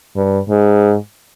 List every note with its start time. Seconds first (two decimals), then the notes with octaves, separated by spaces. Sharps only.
0.16 G2
0.49 G#2